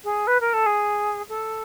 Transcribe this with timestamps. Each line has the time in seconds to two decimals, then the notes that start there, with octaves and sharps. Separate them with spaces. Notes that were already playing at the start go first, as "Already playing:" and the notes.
0.04 G#4
0.27 B4
0.40 A#4
0.53 A4
0.66 G#4
1.29 A4